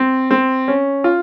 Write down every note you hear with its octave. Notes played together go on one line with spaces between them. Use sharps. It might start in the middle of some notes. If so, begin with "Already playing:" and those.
Already playing: C4
C4
C#4
F4